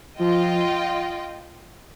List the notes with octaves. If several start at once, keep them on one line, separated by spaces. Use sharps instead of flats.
F3 F4 D#5 G5